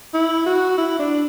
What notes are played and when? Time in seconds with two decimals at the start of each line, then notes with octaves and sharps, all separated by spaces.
0.14 E4
0.46 F#4
0.78 E4
0.99 D4